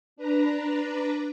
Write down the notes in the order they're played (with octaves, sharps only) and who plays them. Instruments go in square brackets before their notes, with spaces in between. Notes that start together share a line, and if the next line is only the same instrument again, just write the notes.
[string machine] D4 B4 A#5